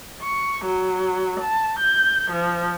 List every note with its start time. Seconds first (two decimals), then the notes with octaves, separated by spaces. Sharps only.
0.23 C#6
0.66 F#3
1.41 A5
1.80 G6
2.32 F3